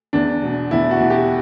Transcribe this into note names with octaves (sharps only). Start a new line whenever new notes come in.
E2 D4
B2
E2 E4
F#4
B2
G4